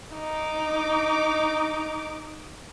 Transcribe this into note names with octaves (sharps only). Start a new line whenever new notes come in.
D#4 D6